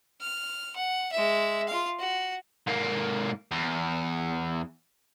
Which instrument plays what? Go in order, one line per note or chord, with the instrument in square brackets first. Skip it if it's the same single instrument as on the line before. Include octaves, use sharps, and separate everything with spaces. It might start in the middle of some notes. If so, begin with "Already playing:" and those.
[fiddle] F6
F#5
G#3 E5
F4 F5
F#4
[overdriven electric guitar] G#2 A#3
E2